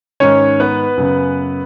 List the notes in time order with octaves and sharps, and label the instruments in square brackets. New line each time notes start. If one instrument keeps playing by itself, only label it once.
[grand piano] G#2 D#3 C#4 C#5
B3 B4
F#2 C#3